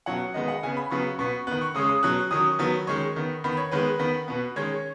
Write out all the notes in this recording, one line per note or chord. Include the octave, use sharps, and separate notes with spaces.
B2 F#3 C#4 F#5
D#3 G#3 B3 D#5
F#5
C#3 B3 G#5
B5
C#3 F#3 B3 C#6
B2 B3 C#6
D#3 B3 F#6
C#6
C#3 G#3 C#4 D#6
D#6
B2 F#3 C#4 F#6
D#3 F#3 C#4 D#6
D#3 F#3 B3
D#3 G#3 C#4 C#6
D#3 B3
D#3 B3 B5
C#5
D#3 G#3 B3 B4
D#3 B3
B2 B3
D#3 G#3 C#4 C#5